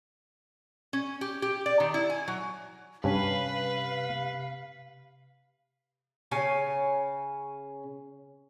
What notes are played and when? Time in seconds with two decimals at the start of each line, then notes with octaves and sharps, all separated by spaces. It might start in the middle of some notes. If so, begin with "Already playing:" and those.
0.93 C#4
1.21 G4
1.42 G4
1.66 D5
1.80 D#3
1.94 E4
2.10 G#5
2.28 F#3
3.04 G2 C3 C#4 B4 F5
6.31 C#3 C#4 F5 G#5